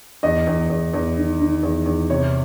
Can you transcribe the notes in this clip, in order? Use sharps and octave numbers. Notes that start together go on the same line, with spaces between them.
E2 D#5
E2
E2
E2
D#3
D#3
E2
E2
C3 C#5